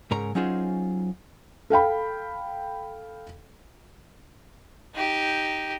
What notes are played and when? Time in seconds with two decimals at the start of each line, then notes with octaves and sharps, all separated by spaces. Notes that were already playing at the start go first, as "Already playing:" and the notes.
0.11 G#2 C#3 A#4 C#5 A#5
0.35 F#3 C#4 D#4 F4 G#4 C5
1.70 A4 F5 G5 B5
4.95 D#4 G4